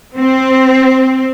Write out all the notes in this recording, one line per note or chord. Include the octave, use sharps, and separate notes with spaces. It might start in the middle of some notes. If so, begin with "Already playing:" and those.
C4